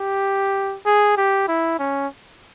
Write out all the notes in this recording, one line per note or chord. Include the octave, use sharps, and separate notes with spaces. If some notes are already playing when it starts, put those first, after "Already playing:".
Already playing: G4
G#4
G4
E4
C#4